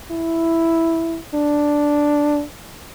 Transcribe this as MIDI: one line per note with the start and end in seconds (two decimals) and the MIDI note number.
0.12 1.19 64
1.35 2.43 62